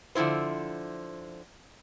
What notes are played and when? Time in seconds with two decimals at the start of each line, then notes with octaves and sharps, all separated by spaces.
0.15 D3 F3 C4 E4 C5